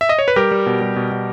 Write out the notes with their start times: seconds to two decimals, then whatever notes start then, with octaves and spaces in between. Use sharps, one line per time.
0.01 E5
0.09 D#5
0.19 C#5
0.28 B4
0.36 G3 G4 A#4
0.51 G3
0.66 B2
0.81 G3
0.96 B2
1.12 B2